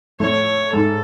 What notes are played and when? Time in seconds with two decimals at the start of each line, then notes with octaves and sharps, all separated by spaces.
0.20 A2 A3 C#5
0.73 G#2 G#3 A4